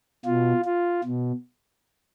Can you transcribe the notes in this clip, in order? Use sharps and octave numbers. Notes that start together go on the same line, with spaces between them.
B2 F4
F4
B2